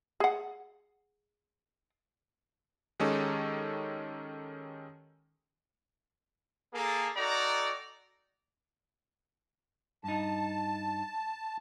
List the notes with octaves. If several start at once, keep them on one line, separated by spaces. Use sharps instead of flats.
G#4 F#5
D#3 G#3 C#4 D#4 G4 A4
A#3 G#4 A4
D#4 F#4 A4 D5 G5 A#5
G2 D#4 A5